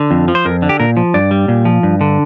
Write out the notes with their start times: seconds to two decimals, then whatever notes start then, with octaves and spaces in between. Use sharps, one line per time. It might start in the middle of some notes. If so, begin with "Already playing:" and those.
Already playing: D3
0.11 F2
0.28 F3
0.35 C5
0.45 F2 A#4
0.62 D3
0.69 G4
0.80 A#2 A#4
0.97 F3
1.14 G2 D5
1.31 G3
1.48 A#2
1.65 F3
1.83 G2
2.01 D3